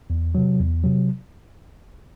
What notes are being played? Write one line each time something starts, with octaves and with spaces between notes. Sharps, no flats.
E2
C3 F#3
E2
C3 F#3